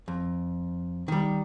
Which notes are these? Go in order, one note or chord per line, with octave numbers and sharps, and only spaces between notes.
F2
D#3 G3